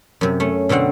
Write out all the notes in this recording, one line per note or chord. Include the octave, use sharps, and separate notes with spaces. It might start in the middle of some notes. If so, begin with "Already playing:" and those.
F#2 C3
A3 C#4
B2 D3 A3 C4 F#5